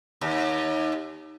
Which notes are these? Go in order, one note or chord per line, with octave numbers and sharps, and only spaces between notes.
D#2